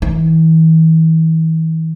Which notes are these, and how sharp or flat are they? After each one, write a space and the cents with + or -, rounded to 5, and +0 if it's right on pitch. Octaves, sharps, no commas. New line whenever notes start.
E3 -40